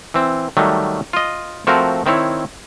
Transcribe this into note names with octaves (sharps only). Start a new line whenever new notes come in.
E3 C4
D#3 F#3 G3 A3
F4 D#5
F3 A3 C4 F#4 A#4
D#3 C4 E4 C#5